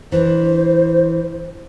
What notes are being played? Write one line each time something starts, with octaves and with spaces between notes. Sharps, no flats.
E3 D4 C5